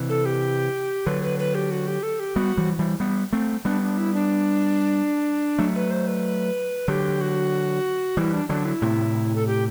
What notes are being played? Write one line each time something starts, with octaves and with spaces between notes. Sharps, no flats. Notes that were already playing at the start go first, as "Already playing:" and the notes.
Already playing: C3 E3
A4
G4
D3 F#3 B4
B4
B4
G4
F#4
G4
A4
G4
G3 B3 F#4
E3 G3
E3 G3
G3 B3
A3 C4
G3 B3 D4
D4
E4
D4
F#3 A3
B4
C5
B4
D3 F#3 G4
F#4
E3 G3 E4
D4
D3 F#3 D4
E4
A2 C3
A4
G4